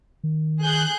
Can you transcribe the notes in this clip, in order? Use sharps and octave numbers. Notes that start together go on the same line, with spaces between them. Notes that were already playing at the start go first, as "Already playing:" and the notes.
D#3
G#4 F#6 G6